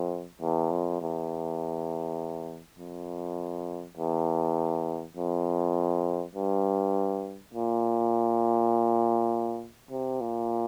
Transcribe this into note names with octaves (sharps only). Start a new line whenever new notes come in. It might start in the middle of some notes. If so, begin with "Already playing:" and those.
Already playing: F2
E2
F2
E2
F2
E2
F2
G2
A#2
C3
A#2